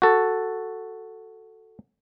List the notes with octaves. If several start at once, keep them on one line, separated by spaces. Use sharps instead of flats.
F#4 A4